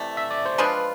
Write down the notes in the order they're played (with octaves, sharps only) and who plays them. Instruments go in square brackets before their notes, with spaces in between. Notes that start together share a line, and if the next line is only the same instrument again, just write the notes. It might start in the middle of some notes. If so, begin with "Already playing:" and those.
Already playing: [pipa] C3 E3 A3 [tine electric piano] D5
[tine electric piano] E5
D5
C5
[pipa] F3 G#3 D4 F4 [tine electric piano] B4